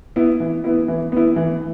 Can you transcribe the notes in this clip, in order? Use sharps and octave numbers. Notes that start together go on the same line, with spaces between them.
B3 E4
E3
B3 E4
E3
B3 E4
E3